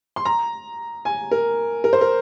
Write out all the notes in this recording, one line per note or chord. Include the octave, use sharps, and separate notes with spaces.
C6
A#5
G#5
A#4
A#4
C5
A#4